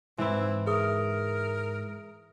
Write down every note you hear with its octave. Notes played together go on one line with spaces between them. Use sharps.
G#2 E3 C4 E4
G#4 A#4 E5 D#6